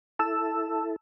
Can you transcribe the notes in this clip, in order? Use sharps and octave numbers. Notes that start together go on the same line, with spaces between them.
E4 A4 A5 E6